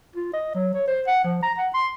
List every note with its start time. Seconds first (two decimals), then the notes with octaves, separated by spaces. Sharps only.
0.16 F4
0.33 D#5
0.55 F#3
0.74 C#5
0.88 C5
1.07 F#5
1.24 F3
1.42 A#5
1.58 F#5
1.74 C6